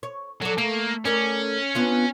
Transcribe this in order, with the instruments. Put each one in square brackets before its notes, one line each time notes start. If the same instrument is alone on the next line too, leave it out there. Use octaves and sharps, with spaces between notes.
[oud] C#5
[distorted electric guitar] F#3 [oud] A4 D5
[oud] A3 [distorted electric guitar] A#3
[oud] A3 A#4 D5 [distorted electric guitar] C#4
[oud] B3 D4 F4